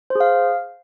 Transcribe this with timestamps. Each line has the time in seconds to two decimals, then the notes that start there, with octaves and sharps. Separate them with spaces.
0.10 C5
0.15 G#4
0.20 F5